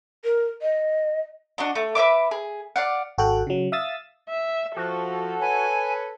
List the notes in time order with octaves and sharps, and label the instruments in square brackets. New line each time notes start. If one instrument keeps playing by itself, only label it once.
[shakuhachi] A#4
D#5
[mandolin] D4 F#4 D#5
A3
B4 C5 E5 D6
G#4
D5 F5 F#5
[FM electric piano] G#1 F#4 A4 G5 F#6
C#3 F#3
E5 F5 D#6 E6 A6
[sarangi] E5
[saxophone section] F3 [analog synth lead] F#4 [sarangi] A4
[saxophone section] B4 C#5 [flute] G#5